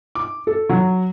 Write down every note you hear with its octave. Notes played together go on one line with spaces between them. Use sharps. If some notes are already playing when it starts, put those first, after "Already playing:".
D6
A4
F#3